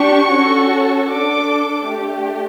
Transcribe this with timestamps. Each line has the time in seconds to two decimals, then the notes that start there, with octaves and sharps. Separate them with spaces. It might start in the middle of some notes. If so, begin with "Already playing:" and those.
Already playing: D4 G4 C#6
0.30 C#4 F#4 A4
1.09 D4 A4 D6
1.86 A3 D4 G4